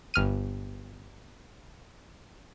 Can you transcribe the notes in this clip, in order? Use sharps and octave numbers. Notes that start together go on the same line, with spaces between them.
G1 F6 D#7